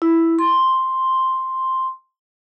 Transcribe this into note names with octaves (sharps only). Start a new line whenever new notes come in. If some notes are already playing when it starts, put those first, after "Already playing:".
E4
C6